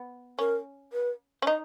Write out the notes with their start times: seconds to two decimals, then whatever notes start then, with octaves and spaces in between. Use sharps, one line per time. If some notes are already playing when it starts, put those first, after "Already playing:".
Already playing: B3
0.39 C#4 A#4
0.93 B4
1.42 C#4
1.46 D#4 D#5